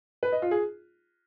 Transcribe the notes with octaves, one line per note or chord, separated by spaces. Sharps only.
B4
D#5
F4
G#4